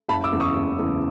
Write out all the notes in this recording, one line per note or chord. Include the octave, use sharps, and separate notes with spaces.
F#1 A5 B5
D6 E6
E2 C#3
C#6 D#6
F#1
E2 C#3